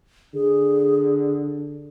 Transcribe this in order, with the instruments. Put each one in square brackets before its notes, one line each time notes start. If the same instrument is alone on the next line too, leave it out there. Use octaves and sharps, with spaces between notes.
[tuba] D3 [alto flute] G#4